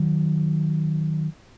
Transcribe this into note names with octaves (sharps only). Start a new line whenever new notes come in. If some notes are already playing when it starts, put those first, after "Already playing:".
Already playing: D#3 F#3